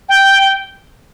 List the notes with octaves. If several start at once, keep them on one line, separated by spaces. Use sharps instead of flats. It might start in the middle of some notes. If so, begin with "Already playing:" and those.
G5